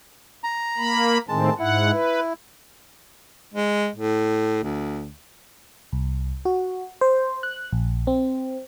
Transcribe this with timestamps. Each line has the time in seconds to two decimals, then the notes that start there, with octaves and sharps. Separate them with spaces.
0.44 A#5
0.78 A#3 B5
1.28 A2 D#3 G#3 C4 A5
1.59 G#2 E4 F#5
1.92 B4
3.54 G#3
3.96 A2
4.63 D2
5.92 C2
6.45 F#4
7.01 C5
7.43 F#6
7.72 A#1
8.07 C4